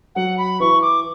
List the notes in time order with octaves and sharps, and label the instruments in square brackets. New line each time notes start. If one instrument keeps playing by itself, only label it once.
[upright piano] F#3 [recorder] F#5
[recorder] B5
[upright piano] E3 [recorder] C#6
[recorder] D6